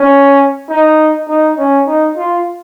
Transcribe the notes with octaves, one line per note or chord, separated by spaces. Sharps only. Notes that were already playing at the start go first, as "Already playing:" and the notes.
Already playing: C#4
D#4
D#4
C#4
D#4
F4